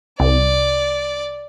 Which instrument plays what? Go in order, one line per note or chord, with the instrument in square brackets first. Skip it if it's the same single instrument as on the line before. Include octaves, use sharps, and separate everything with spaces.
[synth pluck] C2 [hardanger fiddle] D5